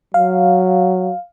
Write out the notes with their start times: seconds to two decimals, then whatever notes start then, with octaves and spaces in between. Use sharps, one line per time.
0.14 F#3 F5